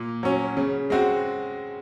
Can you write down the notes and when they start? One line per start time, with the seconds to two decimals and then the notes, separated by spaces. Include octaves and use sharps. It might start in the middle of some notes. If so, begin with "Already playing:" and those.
Already playing: A#2
0.23 F#3 C#4
0.57 C#3
0.90 G#3 C4 F#4